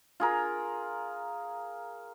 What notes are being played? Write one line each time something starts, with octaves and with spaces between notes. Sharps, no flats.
F4 G#4 A#4